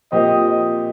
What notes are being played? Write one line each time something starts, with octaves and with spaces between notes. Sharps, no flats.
A#2 F3 C4 G4 D#5